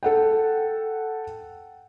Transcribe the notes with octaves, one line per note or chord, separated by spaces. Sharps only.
A4 F#5 G5